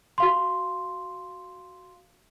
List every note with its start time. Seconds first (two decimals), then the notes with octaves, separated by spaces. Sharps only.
0.18 F#4 F5 C6